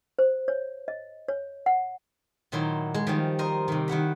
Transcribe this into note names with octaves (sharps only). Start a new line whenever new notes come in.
C5
C#5
D#5
C#5
F#5
A#2 D#3 F#3 E4 C6
G#3
D#3 F3 G3
A#4 C5 D#5
C3 D#3
D#3 E4 F#5 B5